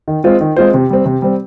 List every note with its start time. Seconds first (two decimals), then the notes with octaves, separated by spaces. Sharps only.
0.08 D#3
0.24 G#3 C4 F4 C5
0.41 D#3
0.56 G#3 C4 F4 C5
0.74 C3
0.90 G3 C4
1.06 C3
1.22 G3 C4